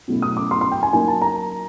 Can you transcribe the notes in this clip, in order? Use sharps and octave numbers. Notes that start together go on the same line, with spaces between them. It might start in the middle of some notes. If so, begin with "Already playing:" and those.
B2 F#3 A3 C#4 E4
D#6
D6
C6
C6
G5
G#5
F#3 A#3 D#4 G#5
A5
A#5